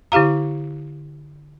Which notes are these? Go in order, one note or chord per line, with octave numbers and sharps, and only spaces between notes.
D3 E4 G4 F5 A#5